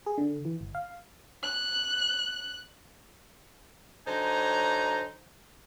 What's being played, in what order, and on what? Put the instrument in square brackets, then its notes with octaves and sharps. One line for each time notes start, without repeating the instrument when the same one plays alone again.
[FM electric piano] G#4
D3
E3
G1
F5
[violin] F#6
[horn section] D3 F#3 D#4 C5 G#5 A#5